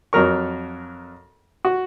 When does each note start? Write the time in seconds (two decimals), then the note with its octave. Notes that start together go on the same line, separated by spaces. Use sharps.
0.13 F2 F#3 A#4 C#6
1.65 F#4